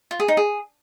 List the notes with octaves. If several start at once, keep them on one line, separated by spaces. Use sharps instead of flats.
F4
G#4
D#4
G#4